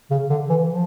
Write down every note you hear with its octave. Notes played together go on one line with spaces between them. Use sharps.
C#3
D3
E3
F3